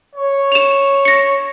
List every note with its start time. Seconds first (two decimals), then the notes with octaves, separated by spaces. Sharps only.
0.15 C#5
0.52 E7 F7
1.05 A#6 C#7